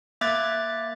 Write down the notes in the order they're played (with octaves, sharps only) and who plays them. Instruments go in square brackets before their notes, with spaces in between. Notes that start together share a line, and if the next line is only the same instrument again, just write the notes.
[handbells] A#3 E5 D6 F#6 G#6 A6